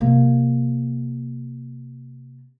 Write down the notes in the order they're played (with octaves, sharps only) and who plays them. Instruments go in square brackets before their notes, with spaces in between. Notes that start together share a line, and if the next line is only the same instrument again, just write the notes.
[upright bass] C3 A#3